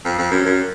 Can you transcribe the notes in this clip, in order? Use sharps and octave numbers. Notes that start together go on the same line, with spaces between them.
F2
F2
F#2
F#2